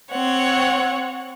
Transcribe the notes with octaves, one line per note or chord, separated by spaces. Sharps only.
C4 C#5 F#5